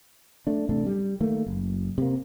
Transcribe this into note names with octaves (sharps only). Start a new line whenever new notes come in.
A3 D4
A1 C3 A3 D4
G3
D#3 A3 A#3
F#1
C3 A#3